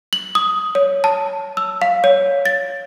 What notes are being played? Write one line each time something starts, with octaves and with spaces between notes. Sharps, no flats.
F#7
D#6
C#5
A5
E6
F5
C#5
A6